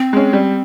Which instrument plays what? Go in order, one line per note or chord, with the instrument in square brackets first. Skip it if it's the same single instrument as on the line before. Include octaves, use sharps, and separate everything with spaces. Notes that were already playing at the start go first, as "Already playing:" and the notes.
Already playing: [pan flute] C4
[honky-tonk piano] G#3 C#4
G3